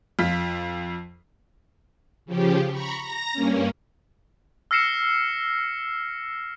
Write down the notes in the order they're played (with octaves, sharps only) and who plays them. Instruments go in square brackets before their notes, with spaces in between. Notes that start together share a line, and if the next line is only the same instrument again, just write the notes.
[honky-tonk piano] F2 F4 B6
[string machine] C#3 F3 G4
A#5 B5 C#6
A#5 A#6
G2 A#3 C#4
[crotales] E6 F6 A#6 C7 C#7 E7